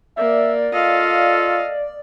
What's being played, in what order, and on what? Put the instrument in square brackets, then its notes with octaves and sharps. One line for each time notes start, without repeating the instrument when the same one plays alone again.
[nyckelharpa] A#3 [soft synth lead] D5 [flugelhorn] E5
[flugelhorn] F4 [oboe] A4 [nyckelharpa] D#5 F5